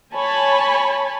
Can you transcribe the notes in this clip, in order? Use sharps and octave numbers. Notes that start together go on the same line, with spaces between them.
C#5 G#5 A5 B5